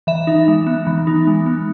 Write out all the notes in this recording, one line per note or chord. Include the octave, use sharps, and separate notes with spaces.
E3 E5
D#4
G#3
B3
E3
D#4
G#3
B3